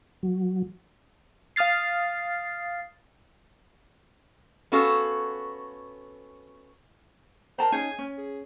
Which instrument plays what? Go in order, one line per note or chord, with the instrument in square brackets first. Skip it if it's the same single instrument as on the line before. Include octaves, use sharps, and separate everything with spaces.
[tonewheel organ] F#3
[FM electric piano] F5 D#6 F6 A6 C7
[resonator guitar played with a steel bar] B3 C#4 F#4 A4 F5
[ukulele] A#4 A5 A#5 [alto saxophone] C5
[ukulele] C#4 D#4 G#4 [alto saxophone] G#5
[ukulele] C#4
[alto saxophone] G#4